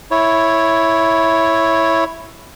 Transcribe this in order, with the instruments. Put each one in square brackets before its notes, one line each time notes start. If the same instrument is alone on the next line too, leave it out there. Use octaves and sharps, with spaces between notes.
[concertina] E4 C#5